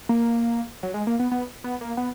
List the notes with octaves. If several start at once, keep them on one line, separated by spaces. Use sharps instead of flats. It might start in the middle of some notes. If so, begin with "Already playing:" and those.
A#3
F#3
G#3
A#3
B3
B3
B3
A#3
B3